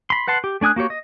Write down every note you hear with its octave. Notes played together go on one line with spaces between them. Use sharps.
B5 C6
B4 F#5 A5 C6
G4
A3 D4 G#5 D#6 F#6
A#3 F#4 G4 C#5
D#5